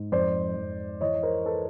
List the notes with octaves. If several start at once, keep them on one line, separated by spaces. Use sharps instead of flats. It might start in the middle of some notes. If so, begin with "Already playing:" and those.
Already playing: G#2
F2 C5 D5
F2
E3 C#5 D#5
A#4 C5
A4 B4